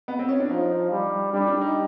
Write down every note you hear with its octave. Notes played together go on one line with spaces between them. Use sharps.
B3
C4
C#4
D4
F3 D#4
G3
G3 D4
D4
D#4